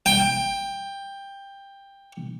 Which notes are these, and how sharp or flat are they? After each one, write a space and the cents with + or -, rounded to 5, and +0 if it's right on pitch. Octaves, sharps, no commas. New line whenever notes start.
G5 +15